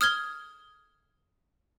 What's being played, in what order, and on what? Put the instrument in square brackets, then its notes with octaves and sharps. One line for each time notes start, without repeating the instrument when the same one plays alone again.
[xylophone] D#6 F6 G#6 G7